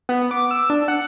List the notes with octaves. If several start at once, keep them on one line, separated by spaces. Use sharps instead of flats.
B3
D6
E6
D4
F#5